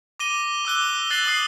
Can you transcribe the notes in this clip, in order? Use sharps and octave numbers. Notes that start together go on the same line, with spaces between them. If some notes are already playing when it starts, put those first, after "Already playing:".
D6 A#6 D#7 G7
D6 E6 F#6 G7
E6 F#6 A6 C7 F#7
D6 D#6 C7